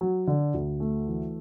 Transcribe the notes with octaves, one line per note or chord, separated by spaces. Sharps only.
F#3
D3
D2
A3
E3